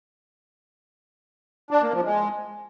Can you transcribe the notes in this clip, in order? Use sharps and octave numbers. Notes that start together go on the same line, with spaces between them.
D4
A#3
F3
G#3